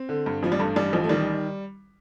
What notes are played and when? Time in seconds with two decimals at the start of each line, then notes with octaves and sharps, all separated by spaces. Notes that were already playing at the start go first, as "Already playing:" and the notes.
Already playing: C4
0.09 D3
0.26 G2
0.43 A1 F3
0.52 G3
0.59 G2 A3
0.76 A1 G3
0.93 A1 F3
1.04 A3
1.09 D#3 G3